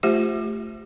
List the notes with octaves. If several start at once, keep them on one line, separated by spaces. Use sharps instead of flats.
A3 F4 G4 C5 E5